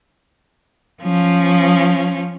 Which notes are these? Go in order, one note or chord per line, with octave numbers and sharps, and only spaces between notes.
F3 C#4